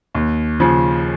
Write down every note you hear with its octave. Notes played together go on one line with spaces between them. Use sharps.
D#2
C#3 F3